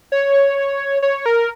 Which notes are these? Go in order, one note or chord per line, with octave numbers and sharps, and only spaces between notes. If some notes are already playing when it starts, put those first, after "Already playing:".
C#5
C#5
A#4